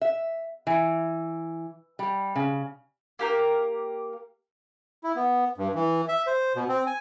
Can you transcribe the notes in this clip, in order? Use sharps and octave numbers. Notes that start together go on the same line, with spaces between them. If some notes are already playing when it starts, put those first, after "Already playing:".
E5
E3
G3
C#3
A#3 G4 A#4
E4
B3
G2
E3
E5
C5
B2
C4
G#5